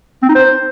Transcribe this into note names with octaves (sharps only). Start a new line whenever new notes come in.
C4
D#4
C5